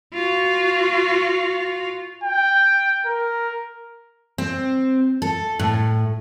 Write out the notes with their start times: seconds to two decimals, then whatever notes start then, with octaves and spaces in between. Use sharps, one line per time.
0.14 F4 F#4
2.24 G5
3.06 A#4
4.38 C4
5.22 A4
5.59 A2